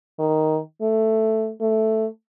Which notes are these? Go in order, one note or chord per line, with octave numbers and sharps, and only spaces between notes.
D#3
A3
A3